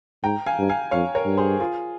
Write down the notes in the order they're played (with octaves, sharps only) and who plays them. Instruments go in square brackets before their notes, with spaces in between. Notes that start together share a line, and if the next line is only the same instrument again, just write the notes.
[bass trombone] G#2 [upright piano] G5 A#5
[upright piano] F5 G#5
[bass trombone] G2
[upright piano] F5 G#5
[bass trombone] F2 [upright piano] C#5 F5
[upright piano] A#4 C#5
[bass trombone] G2
[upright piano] G#4 C5
F4 G#4